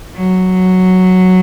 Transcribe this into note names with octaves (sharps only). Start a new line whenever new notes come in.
F#3